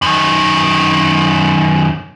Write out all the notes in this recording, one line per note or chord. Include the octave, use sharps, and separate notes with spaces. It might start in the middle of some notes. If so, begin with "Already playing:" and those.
F#2 D#3